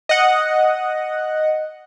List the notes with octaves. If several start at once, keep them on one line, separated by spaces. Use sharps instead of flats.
D#5 F#5